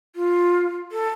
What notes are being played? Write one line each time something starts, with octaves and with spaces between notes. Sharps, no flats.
F4
A4